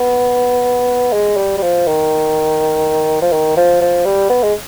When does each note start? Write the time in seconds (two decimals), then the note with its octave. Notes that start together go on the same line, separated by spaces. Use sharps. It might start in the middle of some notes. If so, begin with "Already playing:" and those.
Already playing: B3
1.12 G#3
1.37 G3
1.58 G3
1.62 F3
1.87 D#3
3.22 F3
3.32 D#3
3.57 F3
3.81 F3
4.05 G3
4.29 B3
4.43 G#3